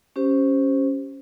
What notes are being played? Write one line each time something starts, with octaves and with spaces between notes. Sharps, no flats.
C#4 G4 C5